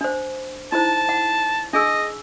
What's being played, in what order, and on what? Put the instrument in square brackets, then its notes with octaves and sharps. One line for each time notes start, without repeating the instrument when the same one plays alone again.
[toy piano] D4 C5
[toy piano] D#4 E4 C5 [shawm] A5
[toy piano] F#5
[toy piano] D4 G#4 E6 [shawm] D#5